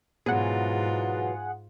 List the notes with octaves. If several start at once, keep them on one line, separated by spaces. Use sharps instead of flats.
G#2 B2 E3 F#3 F4 G#4 F#5